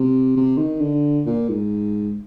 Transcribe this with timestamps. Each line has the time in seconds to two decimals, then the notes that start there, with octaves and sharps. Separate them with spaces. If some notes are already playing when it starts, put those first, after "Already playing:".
Already playing: C3
0.37 C3
0.58 D#3
0.81 D3
1.26 A#2
1.49 G#2